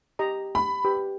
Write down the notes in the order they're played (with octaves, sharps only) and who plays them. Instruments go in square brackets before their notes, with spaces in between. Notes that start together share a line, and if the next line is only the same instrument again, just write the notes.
[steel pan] G4 D#5 A#5
[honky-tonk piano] B5
[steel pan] G4 B4